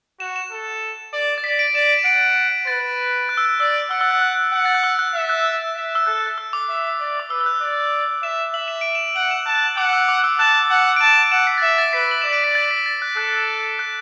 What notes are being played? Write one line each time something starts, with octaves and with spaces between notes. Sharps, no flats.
F#4 E7
E7
A4
D5
A6
D5 B6
D7
D5 E7
E7
F#5 D7
D7
B4 A6
F#6
E6
F#6
D5 E6
F#5 E6
E6
F#6
F#6
F#5
A6
F#6
E6
F#6
E5
F#6
E5
E6
A4 F#6
E6
D6
E5
D5
D6
B4 E6
E6
F#6
D5
E5 E7
E5 F#7
E7
D7
E7
F#5 F#7
E7
A5 F#6
F#5 D6
E6
D6
E6
A5 F#6
F#5
D7
A5 E7
F#5 E7
B6
A6
E5 B6
A6
B4 B6
F#7
D5 E7
D7
B6
A6
B6
A6
F#6
A4 F#6
F#6